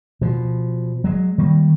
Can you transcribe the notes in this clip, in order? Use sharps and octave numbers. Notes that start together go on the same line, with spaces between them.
B2 F3
F#3 G#3
D#3 G3 A#3